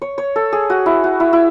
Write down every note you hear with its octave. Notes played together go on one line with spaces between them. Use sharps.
C#5
C#5
A4
G#4
F#4
E4
F#4
E4
E4